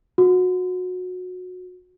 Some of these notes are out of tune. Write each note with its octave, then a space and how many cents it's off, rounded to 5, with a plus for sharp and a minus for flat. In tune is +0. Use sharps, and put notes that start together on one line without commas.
F#4 -25